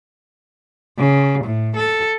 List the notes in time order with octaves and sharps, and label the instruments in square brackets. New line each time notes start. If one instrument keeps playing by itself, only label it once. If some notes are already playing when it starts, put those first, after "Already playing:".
[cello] C#3
A2
A4